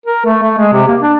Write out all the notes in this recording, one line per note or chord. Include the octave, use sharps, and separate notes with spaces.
A#4
A3
A3
G#3
C3
A#3
D4